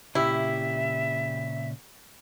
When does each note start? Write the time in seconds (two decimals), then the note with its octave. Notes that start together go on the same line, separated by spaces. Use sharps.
0.15 A#2 C#3 E4 G4 E5